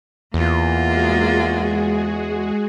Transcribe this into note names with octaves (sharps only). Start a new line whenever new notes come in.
E2 A#3 F4
G#3 F#4 G#4